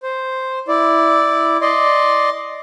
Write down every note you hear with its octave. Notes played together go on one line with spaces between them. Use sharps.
C5
E4 D5
D5 D#5 C6